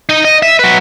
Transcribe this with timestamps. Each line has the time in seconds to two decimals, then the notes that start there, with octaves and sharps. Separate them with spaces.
0.09 D#4 D#5
0.25 D#5
0.42 E5
0.59 F#3 B4